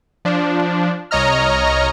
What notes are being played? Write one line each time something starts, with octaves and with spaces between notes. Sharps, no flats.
F3 D4
C2 C#5 D#5 A#5 F6